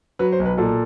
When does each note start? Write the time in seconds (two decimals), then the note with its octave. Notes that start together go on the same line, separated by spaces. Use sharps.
0.19 F#3 B4
0.32 C5
0.39 B1
0.45 B4
0.58 A#2 A4